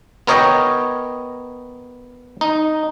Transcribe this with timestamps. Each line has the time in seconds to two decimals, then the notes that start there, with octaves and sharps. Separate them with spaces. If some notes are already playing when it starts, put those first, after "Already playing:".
0.27 B3 A#4 C#5 D#5 G5
2.41 D#4